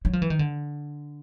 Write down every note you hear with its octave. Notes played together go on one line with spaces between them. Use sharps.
F#3
F3
E3
D#3
D3